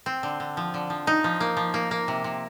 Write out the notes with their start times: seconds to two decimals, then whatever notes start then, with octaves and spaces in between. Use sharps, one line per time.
0.06 C4
0.23 D3
0.40 D3
0.57 F3
0.74 D3
0.90 F3
1.07 D#4
1.24 F3
1.40 A#3
1.57 F3
1.74 A#3
1.91 A#3
2.08 C3
2.24 C3